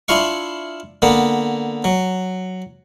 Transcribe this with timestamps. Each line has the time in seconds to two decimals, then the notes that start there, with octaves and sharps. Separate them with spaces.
0.08 D4 E4 F4 F5 C#6
1.02 D3 A#3 B3
1.84 F#3